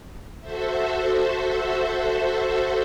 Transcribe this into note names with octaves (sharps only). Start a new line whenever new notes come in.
F#4 A4 C5 E5